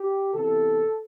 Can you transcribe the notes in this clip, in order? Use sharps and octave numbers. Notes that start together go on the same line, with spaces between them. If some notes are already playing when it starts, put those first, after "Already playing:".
Already playing: G4
C3 E3 B3 A4